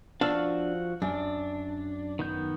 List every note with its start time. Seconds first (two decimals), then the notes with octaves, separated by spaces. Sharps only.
0.21 F3 D4 F#4 F5 E6
1.02 F#2 D4
2.19 D#3 B3 G6